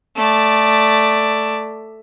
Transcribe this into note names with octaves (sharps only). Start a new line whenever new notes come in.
A3 D5